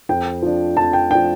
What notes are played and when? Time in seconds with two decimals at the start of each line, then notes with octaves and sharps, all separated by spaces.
0.09 F2 G5
0.42 F3 D4
0.77 F2 A5
0.93 G5
1.10 F3 D4 G5